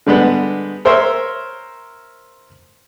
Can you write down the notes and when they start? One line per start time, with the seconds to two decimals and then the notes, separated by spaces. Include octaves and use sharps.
0.06 D3 G3 G#3 B3
0.85 A#4 C5 C#5 E5